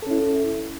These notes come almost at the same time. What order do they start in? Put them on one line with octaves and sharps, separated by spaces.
A4 C#4 E4